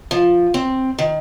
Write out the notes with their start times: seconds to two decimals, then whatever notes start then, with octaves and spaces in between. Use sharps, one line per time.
0.11 F3
0.54 C4
0.99 D#3